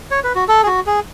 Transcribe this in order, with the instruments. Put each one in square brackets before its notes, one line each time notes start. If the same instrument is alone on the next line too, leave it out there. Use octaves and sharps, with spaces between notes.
[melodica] C#5
B4
F#4
A4
G#4
F#4
G#4